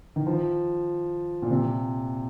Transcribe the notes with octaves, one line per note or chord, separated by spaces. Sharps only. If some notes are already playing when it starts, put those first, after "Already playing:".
D#3
F3
A#2
C3